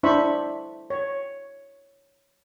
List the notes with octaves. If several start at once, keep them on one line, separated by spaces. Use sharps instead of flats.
D4 E4 C5 E5 B5 C#6
C#5